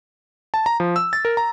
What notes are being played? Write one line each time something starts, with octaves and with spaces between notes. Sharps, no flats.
A5
A#5
F3
E6
A6
A#4
A#5